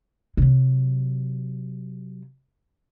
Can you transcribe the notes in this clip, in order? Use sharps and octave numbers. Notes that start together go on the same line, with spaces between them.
C3 F#3